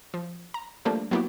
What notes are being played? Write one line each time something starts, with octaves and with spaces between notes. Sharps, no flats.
F3
A#5
F3 G3 A3 A#3 D4
F#3 A#3 B3 E4 F#4 G4